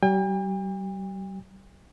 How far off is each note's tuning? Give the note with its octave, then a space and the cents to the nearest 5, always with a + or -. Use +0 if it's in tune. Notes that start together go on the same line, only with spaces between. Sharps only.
G3 -40 G5 +45